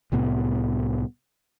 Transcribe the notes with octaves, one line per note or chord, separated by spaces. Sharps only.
C2 A2 C3 B3